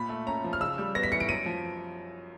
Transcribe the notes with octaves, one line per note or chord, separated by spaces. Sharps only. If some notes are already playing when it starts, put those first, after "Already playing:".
Already playing: A#2 B5
A3
C#4 A#5
F3
F6
C#3 E6
G3
B3 A#6
B6
E3 C#7
D7
F#2 D#7
F3